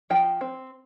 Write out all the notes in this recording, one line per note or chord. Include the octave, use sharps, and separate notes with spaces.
F3 G5
C4